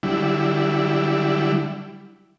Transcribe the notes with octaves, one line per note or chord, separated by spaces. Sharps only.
D3 F#3 G3 E4